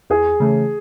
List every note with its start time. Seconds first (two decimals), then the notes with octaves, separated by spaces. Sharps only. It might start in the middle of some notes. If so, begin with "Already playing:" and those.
0.10 E2 G#4
0.40 C#3 E3 A3